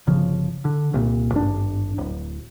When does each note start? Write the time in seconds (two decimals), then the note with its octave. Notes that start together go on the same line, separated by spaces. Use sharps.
0.07 G1 C#3 F3
0.65 D3
0.94 C2 A#2
1.32 G#1 G2 D4
1.98 D1